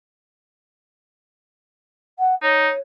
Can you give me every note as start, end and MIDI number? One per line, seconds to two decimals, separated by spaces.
2.19 2.35 78
2.42 2.69 63
2.42 2.80 73